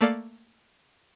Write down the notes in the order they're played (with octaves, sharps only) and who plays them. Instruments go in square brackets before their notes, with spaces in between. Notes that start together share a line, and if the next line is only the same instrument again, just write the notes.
[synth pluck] A3 A#3 A4 D5 F5